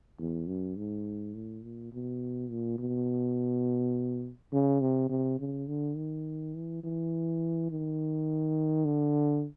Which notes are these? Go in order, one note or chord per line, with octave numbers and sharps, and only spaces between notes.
E2
F#2
G#2
A2
A#2
B2
A#2
B2
C#3
C3
C3
C#3
D3
D#3
E3
E3
D#3
D3